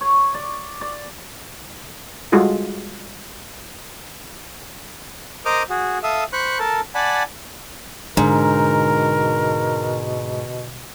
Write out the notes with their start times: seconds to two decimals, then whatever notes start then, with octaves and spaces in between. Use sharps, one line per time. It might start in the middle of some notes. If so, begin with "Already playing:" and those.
0.01 C#5
0.34 D5
0.81 D5
2.32 G3 G#3 F4 F#4 G#4 A4
5.46 A#4 C5 D#5 D6 D#6 F6
5.70 F#4 G#4
6.03 A4 E5 F5 D#6
6.33 C5 B5 C#6 F#6
6.59 A4 A#4 A5
6.95 D5 F#5 G#5 A5 B5
8.17 G#2 B2 D3 A#4